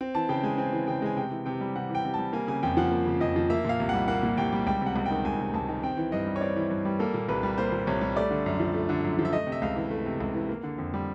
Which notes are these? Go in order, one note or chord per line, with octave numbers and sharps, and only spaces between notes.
C4
E3 A5
C#3 G5
G#3 G#5
C4 G#5
E3
C#3 G5
G#3 G#5
C3 G5
E3
C3 G5
G3
C3 F#5
E3
G5
C3
G3 A5
A#3 G#5
C#3 G#5
F2 G5
F3 F#5
A#3
C#3
F2 D#5
F3
A#3 E5
A#2 F5
C2
G3 F#5
A#3 F#5
A#2
C2 G5
G3
C#2 G5
C3
F#5
C#2
D#3 G5
C#2 G#5
C3
C#2 A5
D#3
C4 G5
E3
G2 D#5
G3
C#5
C4 D5
E3
G2
G3
A#3 A4
A#2
C2 B4
G3
A#3 C5
A#2
C2 C#5
G3
A3 D5
D3
F#2
F3
A3
D3
F#2
F3
E5
A3 D#5
C3
E5
C#2 F5
E3
A3
C3
C#2
E3
A#3
D3
F2
G3